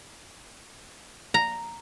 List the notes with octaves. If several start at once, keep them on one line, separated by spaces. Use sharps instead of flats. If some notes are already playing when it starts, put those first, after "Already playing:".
A#5